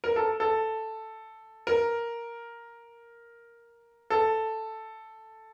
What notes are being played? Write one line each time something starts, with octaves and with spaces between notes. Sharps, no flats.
A#4
A4
A4
A#4
A4